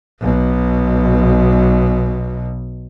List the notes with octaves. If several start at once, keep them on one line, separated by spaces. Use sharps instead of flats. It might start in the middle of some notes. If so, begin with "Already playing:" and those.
B1 B2